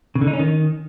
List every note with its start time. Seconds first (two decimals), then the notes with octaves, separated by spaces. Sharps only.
0.15 C#3
0.21 D3
0.27 D#4
0.33 C#4
0.39 D#3